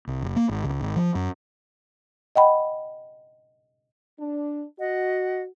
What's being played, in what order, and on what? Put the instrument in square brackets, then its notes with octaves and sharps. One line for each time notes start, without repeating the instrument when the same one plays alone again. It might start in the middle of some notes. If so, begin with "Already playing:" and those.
[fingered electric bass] C2
F#1
A#3
G#1
C#2
G#1
F3
F#2
[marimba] D#5 F#5 G5 B5
[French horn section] D4
[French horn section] F#4 [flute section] D#5 F#5